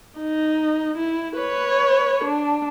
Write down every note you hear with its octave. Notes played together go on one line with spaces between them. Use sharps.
D#4
E4
B4 C#5
D4